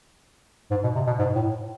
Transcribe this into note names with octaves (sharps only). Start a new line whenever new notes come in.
G#2
B2
C3
B2
G#2
A2